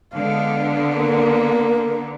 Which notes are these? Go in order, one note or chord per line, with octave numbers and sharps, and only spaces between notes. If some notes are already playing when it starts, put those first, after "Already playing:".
D3 G#3 B3 F5
A#3 A#4